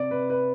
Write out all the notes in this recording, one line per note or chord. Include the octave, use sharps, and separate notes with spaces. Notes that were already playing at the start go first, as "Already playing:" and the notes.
Already playing: C3 D5
C3 B4
B4